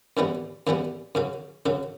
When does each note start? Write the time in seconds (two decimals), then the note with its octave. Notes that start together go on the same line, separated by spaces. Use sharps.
0.17 F#2 E3 G3 B3
0.67 F#2 E3 G3 B3
1.15 F#2 C#3 F#3
1.66 F#2 C#3 F#3